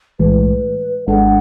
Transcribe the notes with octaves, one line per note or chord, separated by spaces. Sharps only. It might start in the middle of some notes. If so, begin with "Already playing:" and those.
B1 A2 E3 G#3 B4
G#1 G#2 G#3 D4 A4 F#5